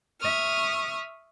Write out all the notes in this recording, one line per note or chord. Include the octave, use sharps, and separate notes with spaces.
E5 C#6 D#6 F6